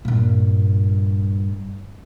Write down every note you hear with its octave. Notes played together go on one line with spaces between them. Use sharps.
G2 A#2